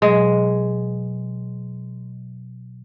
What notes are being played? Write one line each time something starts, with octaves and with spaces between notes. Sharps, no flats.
B2 F#3 G#3